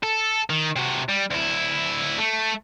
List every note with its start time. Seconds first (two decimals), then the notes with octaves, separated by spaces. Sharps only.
0.03 A4
0.50 D#3
0.76 C3 F#4
1.09 G3
1.31 D2 E4
2.19 A3